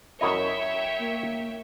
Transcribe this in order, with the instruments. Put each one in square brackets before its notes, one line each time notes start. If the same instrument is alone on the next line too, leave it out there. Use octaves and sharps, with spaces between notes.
[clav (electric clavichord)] F#2 E4 D#5 [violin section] C#5 E5 G5
[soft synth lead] A#3